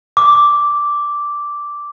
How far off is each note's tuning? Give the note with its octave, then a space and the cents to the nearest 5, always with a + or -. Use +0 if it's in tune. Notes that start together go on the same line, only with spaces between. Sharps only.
D6 -5